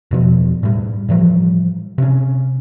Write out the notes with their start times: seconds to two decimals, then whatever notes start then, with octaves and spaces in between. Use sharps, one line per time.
0.11 E1 B2 F3
0.63 A2 G3
1.09 A2 E3 F3 G3
1.98 C3 C#4